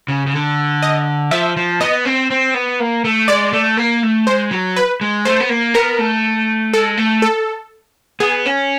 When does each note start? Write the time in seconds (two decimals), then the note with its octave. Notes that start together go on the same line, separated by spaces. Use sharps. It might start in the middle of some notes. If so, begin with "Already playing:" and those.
0.08 C#3
0.26 C#3
0.34 D3
0.83 D#5
1.31 F3 E5
1.57 F3
1.80 B3 D#5
2.05 C4
2.30 C4
2.54 B3
2.80 A#3
3.05 A3
3.28 G#3 D5
3.53 A3
3.77 A#3
4.03 A3
4.27 G#3 C5
4.51 F#3
4.76 B4
5.01 G#3
5.25 A3 C5
5.40 B3
5.49 A#3
5.74 B3 A#4
5.98 A3
6.73 G#3 A4
6.97 A3
7.22 A4
8.20 B3 G#4
8.46 C#4